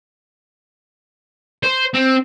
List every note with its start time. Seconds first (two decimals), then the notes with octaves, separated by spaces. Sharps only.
1.63 C5
1.94 C4